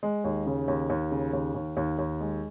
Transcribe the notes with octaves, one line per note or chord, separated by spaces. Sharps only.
G#3
D#2
C#3
D#2
D#2
C#3
D#2
D#2
D#2
D#2
G#3